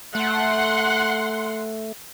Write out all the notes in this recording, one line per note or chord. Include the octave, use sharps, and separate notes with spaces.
A3 F#5 C6